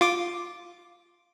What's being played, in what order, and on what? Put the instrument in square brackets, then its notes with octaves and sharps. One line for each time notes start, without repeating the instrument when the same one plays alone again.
[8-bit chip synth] F4 D6